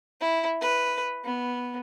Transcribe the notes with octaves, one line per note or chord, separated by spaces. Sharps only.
E4
B4
B3